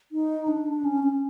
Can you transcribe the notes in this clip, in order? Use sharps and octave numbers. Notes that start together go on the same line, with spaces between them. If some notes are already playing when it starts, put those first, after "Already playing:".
D#4
D4
D4
C#4
C#4